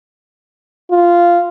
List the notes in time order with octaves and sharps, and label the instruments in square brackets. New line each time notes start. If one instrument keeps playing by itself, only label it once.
[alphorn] F4